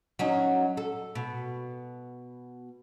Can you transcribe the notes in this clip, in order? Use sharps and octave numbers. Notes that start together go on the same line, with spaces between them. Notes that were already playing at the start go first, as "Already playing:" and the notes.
F#3 C#4 D#4
A4
B2